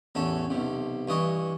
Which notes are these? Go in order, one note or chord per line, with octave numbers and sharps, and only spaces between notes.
A1 E2 C#4 A4
B1 C3
G2 E3 D#5 C#6